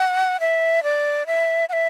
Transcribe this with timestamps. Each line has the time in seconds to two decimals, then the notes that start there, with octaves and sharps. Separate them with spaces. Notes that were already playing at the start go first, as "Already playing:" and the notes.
Already playing: F#5
0.40 E5
0.83 D5
1.27 E5
1.69 F#5
1.73 E5